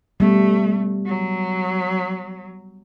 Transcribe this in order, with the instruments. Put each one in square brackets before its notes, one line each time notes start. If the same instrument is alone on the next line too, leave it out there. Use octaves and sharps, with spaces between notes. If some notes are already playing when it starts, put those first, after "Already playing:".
[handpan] G3 B3 [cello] A3
[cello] F#3